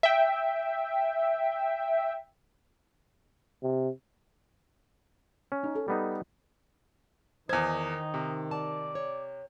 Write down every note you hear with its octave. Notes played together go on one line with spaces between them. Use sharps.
E5 G5
C3
C#4
D#4
A4
G3 B3 D#4
E2 D#3 D#4 C5 G#5 G#6
C3
D5 A5
C#5